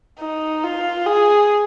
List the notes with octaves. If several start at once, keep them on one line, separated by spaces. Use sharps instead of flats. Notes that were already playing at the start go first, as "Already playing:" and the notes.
D#4
F4
G#4